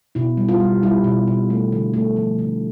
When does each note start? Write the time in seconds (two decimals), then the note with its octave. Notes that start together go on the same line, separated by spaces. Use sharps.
0.15 B2 E4
0.37 G3
0.49 F4
0.60 G3
0.83 G3 E4
1.04 B2
1.28 B2
1.50 A3
1.72 D3
1.94 A3
2.16 F3
2.39 D3